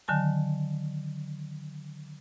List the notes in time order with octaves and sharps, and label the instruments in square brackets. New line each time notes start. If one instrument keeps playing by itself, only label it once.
[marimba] D3 D#3 F#3 G#5 A5